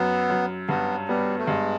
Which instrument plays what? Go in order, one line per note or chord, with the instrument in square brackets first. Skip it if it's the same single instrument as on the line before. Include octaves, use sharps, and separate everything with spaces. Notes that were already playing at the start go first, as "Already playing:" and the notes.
Already playing: [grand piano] F#2 [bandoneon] B3
[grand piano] F#2
[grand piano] G2 [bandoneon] B3
[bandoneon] G3 [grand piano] B3
[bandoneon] A3
[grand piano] G2 [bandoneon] G#3